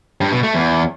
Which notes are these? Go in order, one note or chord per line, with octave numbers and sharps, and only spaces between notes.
G2
B2
A3
E2